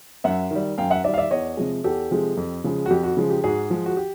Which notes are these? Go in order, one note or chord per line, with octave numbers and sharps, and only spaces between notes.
F#2 E5 F#5
D#3 G3
F#2 F5 G5
E5 F#5
D#3 G3 D5 E5
F5
D5 E5
E2 C#5 D#5
C3 F3 G#3
E2 G4 A4
C3 F3 G#3
F2
C#3 F3 G#3
F#4
F2 G4
F#4
C#3 F3 G#3
G4
G#2 F#4 G#4
F3 G#3
F#4
G4